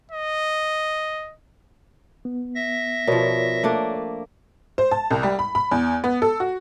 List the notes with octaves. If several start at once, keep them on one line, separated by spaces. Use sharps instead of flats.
D#5
B3
E5 A#6
B2 F3 A#4 C#5 D5
A3 A#3 D4
C5
A5
C2
G3
B5
B5
E2
B3
A4
F#4